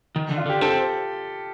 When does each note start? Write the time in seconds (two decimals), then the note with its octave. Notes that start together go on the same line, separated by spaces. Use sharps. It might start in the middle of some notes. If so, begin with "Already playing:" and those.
0.16 D#3
0.31 D3
0.37 F4
0.46 D3 G4
0.61 C4 A4